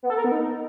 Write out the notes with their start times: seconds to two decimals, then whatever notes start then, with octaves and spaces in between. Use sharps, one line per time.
0.03 B3
0.10 A4
0.17 A#4
0.24 B3
0.32 D#4